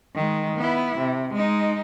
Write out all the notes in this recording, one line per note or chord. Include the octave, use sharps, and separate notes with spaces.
D#3 G#3
B3 E4
C3
G#3 D#4